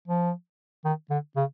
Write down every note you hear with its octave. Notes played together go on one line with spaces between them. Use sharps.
F3
D#3
D3
C#3